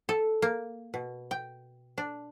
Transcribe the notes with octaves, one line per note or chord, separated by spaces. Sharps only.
A4
A#3
B2
G5
D4